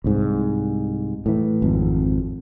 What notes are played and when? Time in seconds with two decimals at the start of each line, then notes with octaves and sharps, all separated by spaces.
0.04 C2 G#2
1.26 A2 E3
1.62 G#1 F2